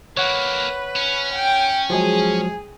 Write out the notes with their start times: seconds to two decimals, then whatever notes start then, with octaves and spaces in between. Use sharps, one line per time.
0.17 E3 A#3 B4 C#5 F#5
0.96 C#4
1.33 G5
1.90 F3 F#3 G#3 G#4